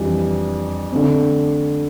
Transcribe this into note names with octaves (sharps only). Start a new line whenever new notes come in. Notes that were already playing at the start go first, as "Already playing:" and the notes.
Already playing: F2 E3 G3 D4
D3 A3 C4